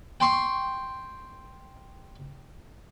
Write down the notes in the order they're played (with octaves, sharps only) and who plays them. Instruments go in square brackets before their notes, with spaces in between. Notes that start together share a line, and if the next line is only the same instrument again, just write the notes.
[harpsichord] G5 C6 C#6